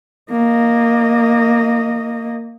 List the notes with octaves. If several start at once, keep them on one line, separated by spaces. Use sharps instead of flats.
A#3 D#5